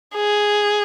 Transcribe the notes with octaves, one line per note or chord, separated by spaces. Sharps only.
G#4